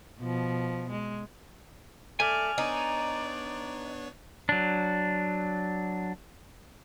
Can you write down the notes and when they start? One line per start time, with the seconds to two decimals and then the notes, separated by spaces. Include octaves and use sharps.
0.20 B2 F3
0.90 G#3
2.20 A3 D5 G#5 F6
2.58 B3 D4 D#4 C#5 D5
4.49 F#3 D4